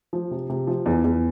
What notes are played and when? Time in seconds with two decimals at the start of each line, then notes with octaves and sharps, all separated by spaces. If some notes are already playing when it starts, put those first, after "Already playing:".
0.13 F3
0.31 C3
0.50 C3
0.67 F3
0.86 E2
1.04 E2